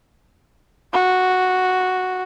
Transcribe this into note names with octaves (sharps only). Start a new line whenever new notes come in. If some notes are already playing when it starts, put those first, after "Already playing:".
F#4